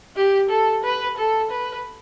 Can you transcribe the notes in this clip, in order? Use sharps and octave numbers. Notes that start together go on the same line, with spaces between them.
G4
A4
B4
A4
B4